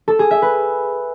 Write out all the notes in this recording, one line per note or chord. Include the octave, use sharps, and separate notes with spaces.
A4
G#4
E5
B4